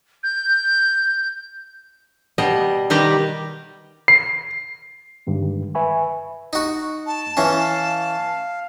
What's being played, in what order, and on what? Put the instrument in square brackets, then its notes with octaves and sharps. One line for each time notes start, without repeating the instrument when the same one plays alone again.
[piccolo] G6
[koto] B2 G3 D#5
D#3 G3 G4 B4 A#5
[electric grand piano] C7
[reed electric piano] G2 D3 D#3 G#3
B4 E5 G#5 B5 C#6
[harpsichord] D#4 F#4
[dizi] A5
[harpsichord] E3 C#4 [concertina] F5